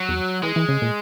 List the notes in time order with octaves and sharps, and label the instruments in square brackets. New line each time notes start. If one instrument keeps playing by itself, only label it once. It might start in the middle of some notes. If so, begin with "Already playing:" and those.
Already playing: [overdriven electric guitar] F#3
[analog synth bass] E2
[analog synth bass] E3 [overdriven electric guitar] G#3
[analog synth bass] E3
C#3
A#2